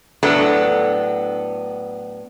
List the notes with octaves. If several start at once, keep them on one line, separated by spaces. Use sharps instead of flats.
A2 F#3 B3 D4 A4